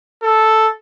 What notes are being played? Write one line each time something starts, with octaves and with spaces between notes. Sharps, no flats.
A4